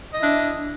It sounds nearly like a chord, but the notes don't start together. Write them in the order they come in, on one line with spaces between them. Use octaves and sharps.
D#5 E4 D4